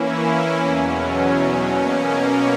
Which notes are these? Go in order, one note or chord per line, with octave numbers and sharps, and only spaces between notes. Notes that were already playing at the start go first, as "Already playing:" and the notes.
Already playing: E3 A#3 C#4 E4
E2 B2 F#3 C#4
B2 A#3 C#4